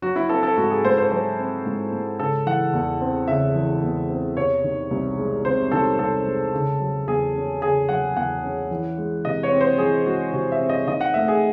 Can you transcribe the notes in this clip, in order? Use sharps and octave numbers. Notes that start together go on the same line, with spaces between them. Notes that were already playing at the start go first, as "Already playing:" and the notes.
F#3 F#4
E4
C4 A4
A4
G#2 F#4
G#4
G#2 C5
C5
F#3 C5
C4
G#2
G#2
C#3 A4
E3 F#5
E2
C4
C#3 E5
E3
E2
C4
C3 C#5
D#3
C2
G#3
C3 C5
D#3 A4
C2 A4
G#3
C#3
F#3
E2 G#4
C#4
C#3 G#4
F#3 F#5
E2 F#5
C#4
E3
G#3
C3 D#5
C#5
C4
C5
E3 G#4
G#3 F#4
C3 F#4
E5
C4
D#5
D#3 D#5
F#5
A3 E5
G#4